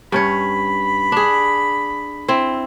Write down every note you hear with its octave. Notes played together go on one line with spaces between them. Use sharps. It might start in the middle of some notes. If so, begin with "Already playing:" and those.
G2 C#4 C#5 B5
D4 G#4
C4 E4